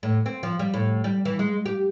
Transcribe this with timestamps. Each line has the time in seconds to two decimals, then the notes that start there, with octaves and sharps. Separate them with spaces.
0.03 A2
0.26 C4
0.43 F3
0.59 G3
0.74 A2
1.04 G3
1.25 E3
1.39 G#3
1.66 G4